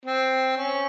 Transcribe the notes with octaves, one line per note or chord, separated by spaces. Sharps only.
C4
C#4